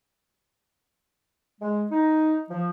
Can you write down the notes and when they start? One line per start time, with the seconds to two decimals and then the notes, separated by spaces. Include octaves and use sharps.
1.61 G#3
1.91 D#4
2.49 F3